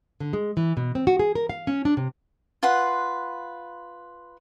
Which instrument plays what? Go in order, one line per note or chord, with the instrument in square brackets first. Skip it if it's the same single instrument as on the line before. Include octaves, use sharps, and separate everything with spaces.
[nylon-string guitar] D3
G#3
E3
B2
C4
F#4
G#4
A#4
F5
C#4
D4
C3
[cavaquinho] F4 B4 F#5 C6